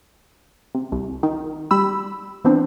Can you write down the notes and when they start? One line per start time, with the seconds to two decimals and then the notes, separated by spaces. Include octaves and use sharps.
0.75 C3
0.92 C2
1.23 D#3
1.71 G3 B5 E6
2.45 E3 B3 C4 D4